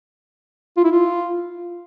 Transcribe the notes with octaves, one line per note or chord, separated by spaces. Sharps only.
F4
E4
F4